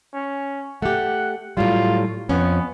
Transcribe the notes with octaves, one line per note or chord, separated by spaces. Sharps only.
C#4
A3 G4 F#5
A2 F#3 G3 F4
F2 B3 C#4